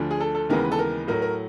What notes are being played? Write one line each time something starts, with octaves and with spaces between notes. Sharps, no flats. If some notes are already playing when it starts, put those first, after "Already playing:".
Already playing: D2 D3 F3
G#4
A4
A4
D#2 C#3 E3 G#3 B3 A#4
B4
A4
A#4
A2 F#3 A3 A#4
A#4